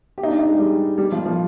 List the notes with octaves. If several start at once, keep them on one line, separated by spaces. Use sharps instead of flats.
G4
D#4
D4
D#4
G#3
G3
G3
F3
F3